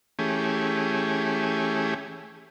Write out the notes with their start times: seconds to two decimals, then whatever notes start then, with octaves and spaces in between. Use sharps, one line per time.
0.19 E3 A3 C#4 G4 G#4